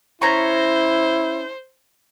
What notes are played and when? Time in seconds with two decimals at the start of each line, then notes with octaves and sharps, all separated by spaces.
0.22 C#4 E4 C5 A#5 C#6